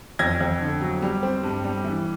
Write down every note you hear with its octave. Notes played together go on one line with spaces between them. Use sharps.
F2 G#6 A#6
F2
D3
F#3
G3
C4
G2
G3
E3